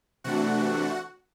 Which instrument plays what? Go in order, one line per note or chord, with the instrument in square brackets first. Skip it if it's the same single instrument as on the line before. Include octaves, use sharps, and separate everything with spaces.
[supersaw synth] C3 E3 A3 D4 F#4 F#5